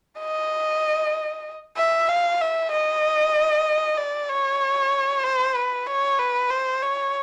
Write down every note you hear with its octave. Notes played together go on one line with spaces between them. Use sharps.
D#5
E5
F5
E5
D#5
D5
C#5
C5
B4
C#5
B4
C5
C#5